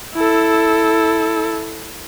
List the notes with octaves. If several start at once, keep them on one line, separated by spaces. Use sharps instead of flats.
E4 A4